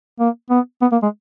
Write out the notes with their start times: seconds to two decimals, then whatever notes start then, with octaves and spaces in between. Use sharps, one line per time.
0.19 A#3
0.50 B3
0.82 B3
0.92 A#3
1.03 G#3